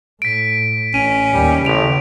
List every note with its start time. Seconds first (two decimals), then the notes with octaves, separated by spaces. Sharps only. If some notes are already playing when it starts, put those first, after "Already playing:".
0.22 A2 B6 D7
0.94 A1 C#4 D#7
1.33 D#2 G3
1.65 A1 C#3 D7 F7